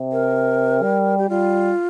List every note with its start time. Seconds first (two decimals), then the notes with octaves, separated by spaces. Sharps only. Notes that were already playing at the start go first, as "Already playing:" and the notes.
Already playing: C3
0.12 A#4
0.83 G3
1.18 G4
1.29 G3 F4